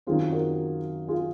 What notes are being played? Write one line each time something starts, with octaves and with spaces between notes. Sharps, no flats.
F#2 D#3 F#3 C4 F4 G#4
F#4 A#4
F4 G#4